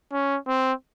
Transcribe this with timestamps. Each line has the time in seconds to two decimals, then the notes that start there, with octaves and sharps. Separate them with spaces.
0.13 C#4
0.48 C4